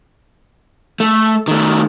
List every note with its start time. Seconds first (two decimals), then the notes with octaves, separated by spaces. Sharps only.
1.00 A3
1.48 D#3 A3